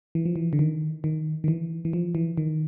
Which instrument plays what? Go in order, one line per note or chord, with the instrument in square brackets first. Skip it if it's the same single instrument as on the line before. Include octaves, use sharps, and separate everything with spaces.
[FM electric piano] E3
F3
E3
D3
D#3
D#3
D#3
E3
E3
F3
E3
D#3